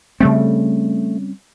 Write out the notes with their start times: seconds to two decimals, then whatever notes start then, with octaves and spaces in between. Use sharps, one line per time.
0.20 C#3 G3 A3 C4